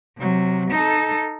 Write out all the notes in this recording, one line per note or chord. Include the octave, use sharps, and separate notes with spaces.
C3 F#3
D#4 A4